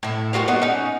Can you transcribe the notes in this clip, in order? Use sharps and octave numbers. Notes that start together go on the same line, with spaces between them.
A2 E4
G3 F4 F#4 A#4
A3 B3 D4 D#4
C#4 D#4